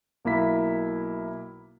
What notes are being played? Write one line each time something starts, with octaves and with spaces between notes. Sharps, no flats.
B1 A#3 E4 B6